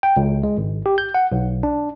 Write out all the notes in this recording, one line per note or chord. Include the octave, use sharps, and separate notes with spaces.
G5
C#2
G#3
G#1
G4
G6
F#5
B1
D4